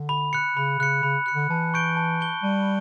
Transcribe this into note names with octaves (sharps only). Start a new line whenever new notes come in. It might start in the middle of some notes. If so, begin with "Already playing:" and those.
Already playing: D3
B5
F#6 C#7
C#3 B5
C#3 F#6 C#7
C#3 B5
F#6 C#7
D3
E3 A5
C#6 G6 D7 G7
A5
C#6 G6 D7 G7
G3 A5